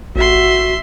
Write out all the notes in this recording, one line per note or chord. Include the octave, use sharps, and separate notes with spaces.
A1 F#4 E5 C6